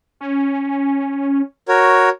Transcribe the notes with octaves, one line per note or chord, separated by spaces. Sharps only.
C#4
F#4 A#4 C#5